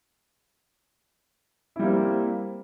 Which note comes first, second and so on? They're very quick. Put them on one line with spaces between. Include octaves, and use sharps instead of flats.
E4 G3 A#3 C4